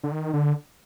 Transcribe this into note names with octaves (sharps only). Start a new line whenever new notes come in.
D3
D#3
D3